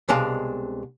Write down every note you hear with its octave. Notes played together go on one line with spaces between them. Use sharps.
C2 B2 G#3 D4 F5 A5